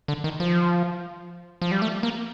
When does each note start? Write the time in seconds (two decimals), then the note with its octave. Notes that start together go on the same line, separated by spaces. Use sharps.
0.08 D3
0.24 D#3
0.40 F3
1.62 F3
1.72 G3
1.82 A3
2.03 A#3